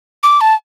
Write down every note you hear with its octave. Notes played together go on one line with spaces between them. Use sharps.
D6
A5